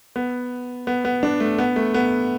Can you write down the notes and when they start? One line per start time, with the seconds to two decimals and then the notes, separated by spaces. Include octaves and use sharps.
0.16 B3
0.87 B3
1.05 B3
1.23 D4
1.40 A3
1.58 B3
1.76 A3
1.94 B3